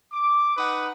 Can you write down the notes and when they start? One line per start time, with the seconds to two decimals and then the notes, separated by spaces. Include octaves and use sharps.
0.12 D6
0.57 D#4 B4 F#5 D#6